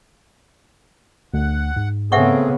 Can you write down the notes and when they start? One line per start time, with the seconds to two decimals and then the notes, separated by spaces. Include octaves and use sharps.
1.34 D2 F#5
1.76 G#2
2.12 C#3 A3 B3 C4 G#4 E5 F#5 C#6